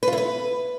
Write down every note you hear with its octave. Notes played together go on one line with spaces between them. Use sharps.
B4
F4
E4
B4